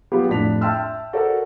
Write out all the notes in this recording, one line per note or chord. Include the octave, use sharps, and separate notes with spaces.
F#3 B3 F4 G4
F2 A2 D4 B6 F7
E5 G5 A5 C6 E6 F6
F#4 A4 A#4 C5 D5